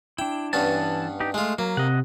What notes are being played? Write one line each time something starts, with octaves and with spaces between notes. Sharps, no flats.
D4 E4 G5
G2 E3 B3 C#4 A5
D#4 G4
G#3 A3 F4
F#3 A#3
C3 D#5 F#5